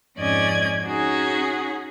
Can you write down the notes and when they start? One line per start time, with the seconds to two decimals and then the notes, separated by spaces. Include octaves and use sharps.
0.17 F2 G#2 C#4 D5 D#5 G#6
0.84 C#4 D#4 F#4 G#4